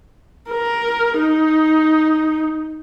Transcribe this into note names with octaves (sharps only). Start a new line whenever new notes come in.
A#4
D#4